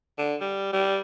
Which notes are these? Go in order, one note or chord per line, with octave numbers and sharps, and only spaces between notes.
D3
G3
G3